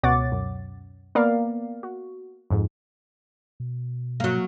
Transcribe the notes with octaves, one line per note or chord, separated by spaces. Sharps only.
C#2 B2 C#5 F#5 D6 A6
F#2
A#3 B3 A#4 D5 F5
F#4
F2 G#2
B2
F#3 A#3